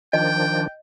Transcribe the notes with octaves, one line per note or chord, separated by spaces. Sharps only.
D#3 F3 D4 D#5 G5